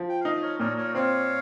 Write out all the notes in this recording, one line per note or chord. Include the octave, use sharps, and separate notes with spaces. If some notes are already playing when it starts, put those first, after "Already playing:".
Already playing: F3
G5
D#4 F5
D#5
A#4 C#5
A#2 A#4 C#5
A#4 C#5
C4 C#5 F5